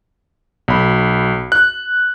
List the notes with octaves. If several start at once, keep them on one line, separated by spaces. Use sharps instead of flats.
B1 B5
F#6